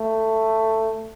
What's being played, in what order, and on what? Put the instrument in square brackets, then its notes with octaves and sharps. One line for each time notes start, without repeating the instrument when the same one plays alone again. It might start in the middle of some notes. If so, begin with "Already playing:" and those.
Already playing: [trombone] A3